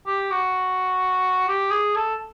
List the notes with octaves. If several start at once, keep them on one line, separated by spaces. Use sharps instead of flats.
G4
F#4
G4
G#4
A4